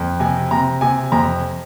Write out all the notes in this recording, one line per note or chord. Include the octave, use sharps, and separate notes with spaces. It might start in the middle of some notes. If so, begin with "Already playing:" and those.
Already playing: F2
C3 G#5
C3 A#5
C3 G#5
F2 A#5